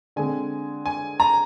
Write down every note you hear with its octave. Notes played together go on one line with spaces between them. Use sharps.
D3 G#3 C4 G#5
G#5
A#5